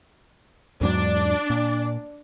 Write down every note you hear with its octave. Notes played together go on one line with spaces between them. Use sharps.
E2 G#2 F#3 D4 D5
A#2